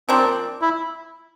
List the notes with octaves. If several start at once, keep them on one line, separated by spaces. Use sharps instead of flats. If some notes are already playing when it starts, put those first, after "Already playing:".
F3 A#3 C4 D4
E4